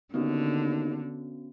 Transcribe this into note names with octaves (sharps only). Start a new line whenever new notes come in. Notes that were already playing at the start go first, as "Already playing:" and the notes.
D#2 D3 B3 C#4 F#4